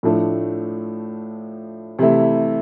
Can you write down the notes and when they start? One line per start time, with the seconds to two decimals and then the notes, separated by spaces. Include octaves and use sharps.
0.03 A2 F3 A3 D4
1.99 C3 E3 A3 E4